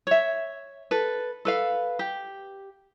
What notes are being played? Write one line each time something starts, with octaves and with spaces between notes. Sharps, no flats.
C#5 E5
A4 B4
A4 B4 F5
G4